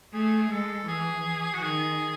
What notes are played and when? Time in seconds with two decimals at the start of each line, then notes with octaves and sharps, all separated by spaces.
0.13 A3 G#4
0.51 G#3 A4
0.87 E3 G#4
1.24 E3
1.53 F#4
1.62 D#3 G#4